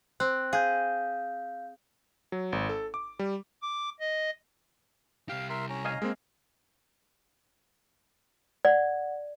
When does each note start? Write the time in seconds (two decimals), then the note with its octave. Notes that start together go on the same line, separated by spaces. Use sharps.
0.20 C4 F#6
0.53 G#4 F5 G6
2.32 F#3
2.52 G#1
2.69 A4
2.94 D6
3.19 G3
3.62 D6
4.00 D#5
5.29 C2 G4 F5
5.50 A#4 E5 C6
5.69 C#4 A#5
5.85 D#5 F5 G#5
6.02 G#3 A#3 C4
8.65 D5 F#5